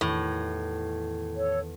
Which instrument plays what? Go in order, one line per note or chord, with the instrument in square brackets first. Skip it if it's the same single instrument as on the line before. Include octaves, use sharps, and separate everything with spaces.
[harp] E2 D#3 G4 [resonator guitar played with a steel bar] A2
[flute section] A4 C#5